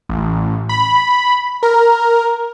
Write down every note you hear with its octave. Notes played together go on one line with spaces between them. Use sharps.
A1
B5
A#4